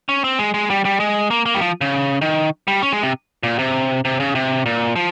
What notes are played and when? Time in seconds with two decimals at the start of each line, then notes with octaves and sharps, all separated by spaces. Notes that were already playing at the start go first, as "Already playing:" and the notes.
0.09 C#4
0.24 C4
0.39 G#3
0.54 G#3
0.70 G3
0.85 G3
1.00 G#3
1.31 A#3
1.46 A#3
1.55 G3
1.61 F3
1.81 C#3
2.21 D#3
2.68 G3
2.82 C#4
2.92 G#3
3.03 C3
3.43 A#2
3.59 C3
4.05 C3
4.20 C#3
4.35 C3
4.66 A#2
4.96 F3